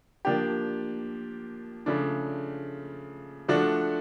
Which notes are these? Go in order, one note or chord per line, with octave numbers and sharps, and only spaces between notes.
F3 A#3 D4 G4
C#3 F3 A3 D4
F3 A3 D4 F#4